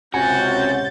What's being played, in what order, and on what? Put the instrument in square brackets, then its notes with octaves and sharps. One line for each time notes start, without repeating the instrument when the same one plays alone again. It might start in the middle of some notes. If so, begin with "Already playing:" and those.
[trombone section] C#2 C3 C#4 [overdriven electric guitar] F#4 [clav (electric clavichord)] G#5 [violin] G6 A6